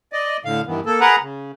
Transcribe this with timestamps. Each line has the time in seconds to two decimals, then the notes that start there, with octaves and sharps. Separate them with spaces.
0.13 D5 D#5
0.45 A2 D3 F5
0.67 G2 D#3 E3 B3
0.86 A#3 A4
1.00 G#4 A#4 B4 F#5 A#5
1.21 C#3